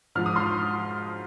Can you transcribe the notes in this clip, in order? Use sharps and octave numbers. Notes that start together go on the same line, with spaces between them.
G#2 F3 F6
D#6
C6 F6